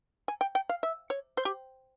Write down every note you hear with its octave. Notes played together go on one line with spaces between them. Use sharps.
G#5
G5
G5
F5
E5
C#5
C5
G4